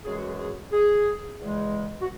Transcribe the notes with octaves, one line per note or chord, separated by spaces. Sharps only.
F#2 E3 G#3 G#4
F#4
G#4
G#4
G#4
E2 C#3 E3 G#3
F#4